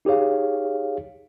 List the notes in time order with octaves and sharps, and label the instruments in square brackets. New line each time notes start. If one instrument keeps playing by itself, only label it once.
[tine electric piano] D#4 G4 G#4 C#5 F5